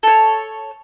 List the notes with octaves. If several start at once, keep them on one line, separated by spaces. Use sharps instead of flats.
A4 C#5